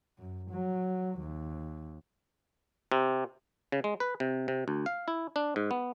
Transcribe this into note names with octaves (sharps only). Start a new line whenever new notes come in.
F#2
F#3
D#2
C3
C#3
G#3
B4
C3
C3
D2
F5
E4
D4
G#2
B3